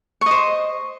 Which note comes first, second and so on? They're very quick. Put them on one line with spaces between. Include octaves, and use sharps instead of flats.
C#6 D#5 C5